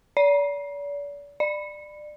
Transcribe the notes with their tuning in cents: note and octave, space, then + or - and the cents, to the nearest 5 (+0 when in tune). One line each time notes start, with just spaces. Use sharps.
D5 -40
D5 +25